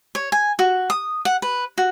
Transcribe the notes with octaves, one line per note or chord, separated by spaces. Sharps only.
C#5
G#5
F#4
D#6
F#5
B4
F#4